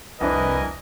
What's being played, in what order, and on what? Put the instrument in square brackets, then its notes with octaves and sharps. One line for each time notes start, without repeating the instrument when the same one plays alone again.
[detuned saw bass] C2 [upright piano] F2 D4 E4 [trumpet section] A#4 D#5 G#5 [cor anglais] B4